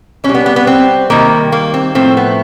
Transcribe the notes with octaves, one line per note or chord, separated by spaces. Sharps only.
B2 C#4
G3
B3
B3
B3
C4
C3 D#3 G3 A#3
A#3
C4
A2 F3 A3 C4
B3